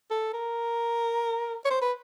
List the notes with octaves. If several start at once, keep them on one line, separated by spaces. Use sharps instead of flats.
A4
A#4
C#5
C5
B4